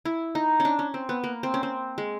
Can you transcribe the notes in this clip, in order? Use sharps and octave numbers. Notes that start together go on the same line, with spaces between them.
E4
D#4
C#4
D4
C#4
C4
B3
A#3
C4
C#4
C4
G#3